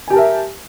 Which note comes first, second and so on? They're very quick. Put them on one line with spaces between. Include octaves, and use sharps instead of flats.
G#5 G4 A5 A#4 E5